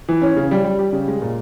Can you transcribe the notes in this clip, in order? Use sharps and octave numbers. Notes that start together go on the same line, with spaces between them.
E3
C#4
C#3
G3
G3
G4
C#3
G#3
A#2